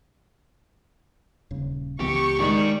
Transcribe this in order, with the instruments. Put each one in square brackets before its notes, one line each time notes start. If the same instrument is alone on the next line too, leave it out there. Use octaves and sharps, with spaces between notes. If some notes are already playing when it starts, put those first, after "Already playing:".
[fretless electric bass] D#1 C#3
[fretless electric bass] C#2 E3 B3 [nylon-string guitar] C3 [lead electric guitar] G4 [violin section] C#6
[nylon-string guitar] D#3 G#3 [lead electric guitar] G4 D5